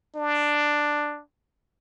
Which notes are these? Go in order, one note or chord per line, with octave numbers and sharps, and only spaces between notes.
D4